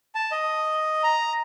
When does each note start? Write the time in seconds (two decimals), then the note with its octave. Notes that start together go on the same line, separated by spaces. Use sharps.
0.15 A5
0.31 D#5
1.03 A#5